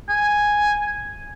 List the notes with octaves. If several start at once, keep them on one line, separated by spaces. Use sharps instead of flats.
G#5